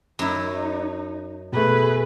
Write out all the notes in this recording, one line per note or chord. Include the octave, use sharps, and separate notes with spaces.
F#2 D#4 E4
B2 A3 G#4 B4